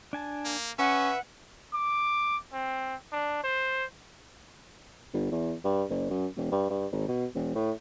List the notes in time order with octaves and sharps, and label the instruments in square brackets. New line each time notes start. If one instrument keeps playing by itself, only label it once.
[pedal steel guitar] D4 G#5 A5
[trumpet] A#3
[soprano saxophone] C#4 [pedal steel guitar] B4 [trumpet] E5 [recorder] F#5
[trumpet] D6
C4
D4
C5
[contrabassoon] G1
E2
G2
F#1
F#2
E1
G2
G2
G#1
B2
E1
A2